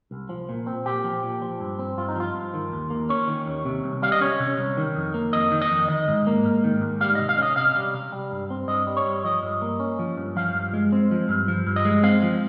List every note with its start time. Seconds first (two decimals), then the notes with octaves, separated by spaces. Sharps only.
0.11 C2
0.29 F3
0.49 A#2
0.67 C4
0.85 A#2 G4
1.04 F3
1.23 A#2
1.42 F3
1.60 G2
1.79 C4
1.97 G2 F4
2.08 D#4
2.16 F3 F4
2.34 G2
2.54 D#3
2.72 D#2
2.90 A#3
3.09 C#4 C#5
3.28 D#3
3.46 D#2
3.65 C3
3.84 C2
4.02 G3 F5
4.12 D#5
4.21 C#4 C#5
4.40 C3
4.59 C2
4.77 D#3
4.96 F2
5.14 A#3
5.33 F2 D#5
5.52 D#3
5.62 D#5
5.71 F2
5.89 D#3 D#5
6.08 G#2
6.27 A#3
6.45 G#2
6.64 D#3
6.81 G#2
7.00 G3 F5
7.15 C3 D#5
7.29 F5
7.38 C#4 D#5
7.56 C3 F5
7.76 G3
7.94 C3
8.12 G3
8.32 G2
8.50 C4
8.68 G2 D#5
8.87 G3
8.97 C#5
9.06 G2
9.24 F3 D#5
9.43 G2
9.62 A#3
9.80 C#4
9.99 F3
10.17 G2
10.36 F3 F5
10.54 G2
10.74 G#3
10.92 C4
11.11 F3
11.29 G2
11.48 F3
11.67 G2
11.76 D#5
11.85 G#3
12.03 C4 F5
12.23 F3